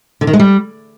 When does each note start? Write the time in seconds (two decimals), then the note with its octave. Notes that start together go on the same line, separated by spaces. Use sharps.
0.21 D3
0.27 D#3
0.33 G#3
0.39 G3